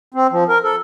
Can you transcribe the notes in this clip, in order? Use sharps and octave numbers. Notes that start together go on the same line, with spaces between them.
C4
F3
A#4
A4